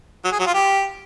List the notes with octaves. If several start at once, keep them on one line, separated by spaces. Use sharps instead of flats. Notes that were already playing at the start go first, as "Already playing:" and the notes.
F#3
G#4
F#3
F4
G4